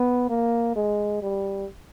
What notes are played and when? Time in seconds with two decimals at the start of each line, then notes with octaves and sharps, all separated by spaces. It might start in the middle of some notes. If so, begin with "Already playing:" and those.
Already playing: B3
0.30 A#3
0.76 G#3
1.22 G3